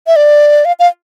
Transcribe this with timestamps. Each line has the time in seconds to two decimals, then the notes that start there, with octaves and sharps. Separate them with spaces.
0.07 E5
0.16 D5
0.65 F5
0.79 F5